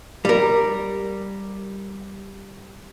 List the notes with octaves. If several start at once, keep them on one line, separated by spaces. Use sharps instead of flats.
G3 A#4